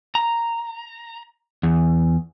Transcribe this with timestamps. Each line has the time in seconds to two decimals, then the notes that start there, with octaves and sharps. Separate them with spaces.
0.15 A#5
1.63 E2